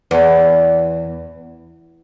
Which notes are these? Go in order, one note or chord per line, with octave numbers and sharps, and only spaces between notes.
E2